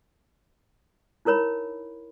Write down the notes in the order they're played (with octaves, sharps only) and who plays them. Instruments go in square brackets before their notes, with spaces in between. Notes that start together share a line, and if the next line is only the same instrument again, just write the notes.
[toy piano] D#4 E4 A#4 C#5 B5